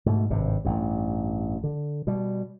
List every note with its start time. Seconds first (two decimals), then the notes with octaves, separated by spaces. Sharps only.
0.06 G#2 B2 A3
0.30 G#1 G2 C3
0.65 A1 G2
1.64 D3
2.07 B2 G3